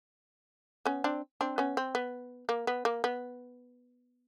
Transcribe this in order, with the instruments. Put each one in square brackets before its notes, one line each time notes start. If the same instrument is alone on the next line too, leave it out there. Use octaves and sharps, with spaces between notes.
[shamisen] B3 C#4
C4 D4
C4 D4
B3 C#4
C4
B3
A#3
B3
A#3
B3